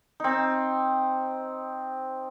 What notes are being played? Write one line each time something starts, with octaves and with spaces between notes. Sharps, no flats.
C4 D#4